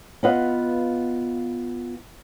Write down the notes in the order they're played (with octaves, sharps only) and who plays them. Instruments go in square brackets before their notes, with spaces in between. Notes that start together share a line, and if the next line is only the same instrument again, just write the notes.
[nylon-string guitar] B3 F4 B4 D#5 F5 F#5